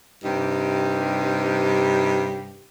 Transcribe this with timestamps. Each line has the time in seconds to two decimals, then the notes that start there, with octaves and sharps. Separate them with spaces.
0.24 G2 C3 D#4 G4